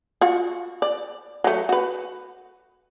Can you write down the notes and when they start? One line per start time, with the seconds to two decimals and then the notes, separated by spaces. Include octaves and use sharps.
0.21 F4 F#4
0.82 D5
1.44 F#3 A3
1.69 F#4 B4